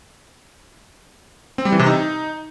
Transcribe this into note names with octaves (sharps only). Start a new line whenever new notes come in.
C4
G3
E3
C3
D#4